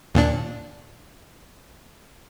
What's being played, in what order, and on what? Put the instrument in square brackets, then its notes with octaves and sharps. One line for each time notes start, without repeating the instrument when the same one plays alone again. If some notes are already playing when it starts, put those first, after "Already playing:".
[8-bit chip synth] D#2 A#2 D4